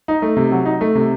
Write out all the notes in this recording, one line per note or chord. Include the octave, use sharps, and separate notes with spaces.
D#4
A3
C3
F#3
D#4
A3
C3